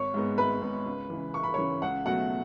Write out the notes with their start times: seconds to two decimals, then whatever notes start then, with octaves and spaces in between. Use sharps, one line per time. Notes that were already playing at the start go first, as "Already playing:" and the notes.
Already playing: G#1 C#5 C#6
0.14 G#2 G#3 B3
0.38 G#1 B4 B5
0.61 G#2 G#3 B3
0.86 C#2
1.10 C#3 E3
1.34 C#2 C#6
1.43 B5
1.54 C#3 E3 C#5 C#6
1.82 C#2 F#5
2.06 B2 F#3 A3 F#5